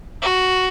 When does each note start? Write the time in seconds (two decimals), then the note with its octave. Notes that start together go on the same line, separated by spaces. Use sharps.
0.22 F#4